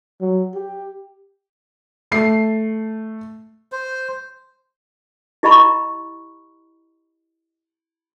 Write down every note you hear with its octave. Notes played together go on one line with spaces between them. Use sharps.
F#3
G4
A3 C7
C5
E4 G4 D#5 A#5 B5 C#6